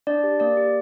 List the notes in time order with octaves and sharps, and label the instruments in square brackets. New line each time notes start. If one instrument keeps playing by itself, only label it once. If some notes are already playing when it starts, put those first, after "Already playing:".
[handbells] D4 D5
G4
A#3 D5
G4